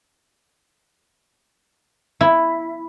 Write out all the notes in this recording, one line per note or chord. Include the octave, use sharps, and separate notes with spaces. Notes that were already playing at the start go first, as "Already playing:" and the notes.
E4